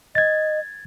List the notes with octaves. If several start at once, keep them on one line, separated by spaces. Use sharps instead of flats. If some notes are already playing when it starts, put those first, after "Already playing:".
D#5 G#6 A6